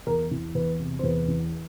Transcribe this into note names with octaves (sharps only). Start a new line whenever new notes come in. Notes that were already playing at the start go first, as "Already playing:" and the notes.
E2 A#4
E3
E2 B4
C3
C5
E2 B4
E3